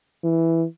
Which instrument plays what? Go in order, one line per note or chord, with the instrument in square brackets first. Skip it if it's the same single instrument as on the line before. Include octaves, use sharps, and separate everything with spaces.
[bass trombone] E3